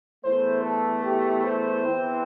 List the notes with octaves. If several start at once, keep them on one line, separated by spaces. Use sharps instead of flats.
E2 E3 A3 C5
A4
G4
C5
E2 E3 C4